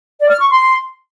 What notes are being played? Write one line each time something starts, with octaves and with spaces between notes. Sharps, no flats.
D5
F6
C#6
C6